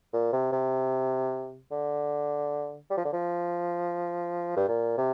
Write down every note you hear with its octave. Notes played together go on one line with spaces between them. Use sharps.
A#2
C3
C3
D3
G3
F3
D3
F3
G2
A#2
C3